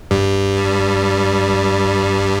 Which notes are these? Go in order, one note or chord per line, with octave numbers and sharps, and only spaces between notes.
G2 G3